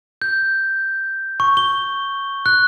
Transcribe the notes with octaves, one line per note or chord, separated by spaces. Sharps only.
G6
C#6
G7
F#6